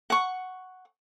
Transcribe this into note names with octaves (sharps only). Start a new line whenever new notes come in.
F#5 C#6